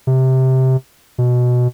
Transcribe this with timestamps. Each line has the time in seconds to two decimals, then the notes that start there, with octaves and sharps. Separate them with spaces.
0.07 C3
1.18 B2